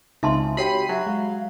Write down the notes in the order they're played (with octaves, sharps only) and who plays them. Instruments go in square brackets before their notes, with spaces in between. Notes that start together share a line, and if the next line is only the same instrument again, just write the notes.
[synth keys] C#2 [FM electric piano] C4 D#4 G#5 [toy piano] E5 A5 C6
[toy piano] F#4 C#5 G5 [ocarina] G4 [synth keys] B5 C7 D#7
[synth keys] F#3 [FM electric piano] G4 [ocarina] E5 [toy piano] G#5
[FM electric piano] G#3 [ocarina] F5